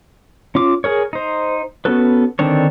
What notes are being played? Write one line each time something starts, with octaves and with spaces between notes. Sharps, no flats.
C#4 F4 D6
G#4 A#4 C#5
D#4 C5
B3 C#4 F#4 A4 B4
D3 D#3 C4 D4 C#5